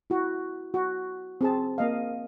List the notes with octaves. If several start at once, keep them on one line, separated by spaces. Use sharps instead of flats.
E4 F#4
F#4
C4 G#4 A5
A#3 D#5 F5